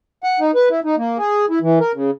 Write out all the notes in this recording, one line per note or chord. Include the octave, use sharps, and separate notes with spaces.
F#5
D#4
B4
E4
D#4
A#3
G#4
E4
E3
A#4
C#3